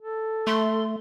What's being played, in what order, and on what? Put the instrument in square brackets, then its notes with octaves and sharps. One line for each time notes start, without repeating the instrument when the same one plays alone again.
[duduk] A4
[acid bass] A3 [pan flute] C6